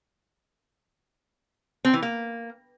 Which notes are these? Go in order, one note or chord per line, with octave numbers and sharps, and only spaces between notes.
C4
E3
A#3